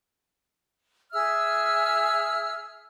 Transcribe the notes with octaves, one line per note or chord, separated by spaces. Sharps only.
G#4 E5 E6 F6